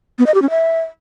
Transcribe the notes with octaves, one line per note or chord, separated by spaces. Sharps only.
B3
D#5
G4
C#4
E5